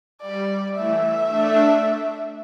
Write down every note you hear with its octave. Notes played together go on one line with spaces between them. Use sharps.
G3 D5
E3 A3 E5
A3 D4